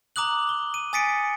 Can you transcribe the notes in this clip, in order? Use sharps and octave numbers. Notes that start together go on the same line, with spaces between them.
A#5 D6 D#6 F#6 F#7
G7
D#7
G#5 D#6 A6 B6 C#7 D7